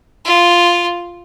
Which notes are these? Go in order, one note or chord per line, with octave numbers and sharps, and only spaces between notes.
F4